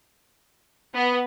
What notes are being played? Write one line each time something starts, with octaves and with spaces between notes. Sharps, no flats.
B3